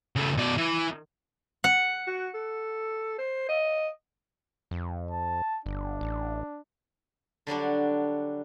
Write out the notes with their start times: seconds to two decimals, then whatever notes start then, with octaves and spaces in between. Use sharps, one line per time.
0.16 C#3 A3
0.38 B2 D5
0.57 E3
1.64 F#5
2.07 F#4
2.34 A4
3.18 C5
3.49 D#5
4.71 F2
5.11 A5
5.66 G1 D4
6.01 A1
7.47 D3 F#3 G3 D4